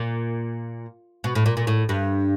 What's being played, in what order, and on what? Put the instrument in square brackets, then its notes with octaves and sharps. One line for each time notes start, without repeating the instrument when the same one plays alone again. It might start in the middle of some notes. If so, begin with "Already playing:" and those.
Already playing: [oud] A#2
B2
A2
A#2
A#2
A2
G2